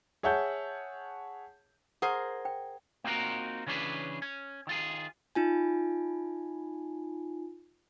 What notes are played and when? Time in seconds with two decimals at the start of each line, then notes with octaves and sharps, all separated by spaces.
0.23 G#4 C#5 E5 F#5 A5 G6
2.02 G#4 A#4 C5 F#5
2.45 G5
3.04 A#3 C4 D#4 F4 F#4 A#4
3.66 C#3 E3 C#4 D4 G#4 B4
4.22 C#4
4.67 D#3 F4 G#4
5.35 D#4 F4 G#5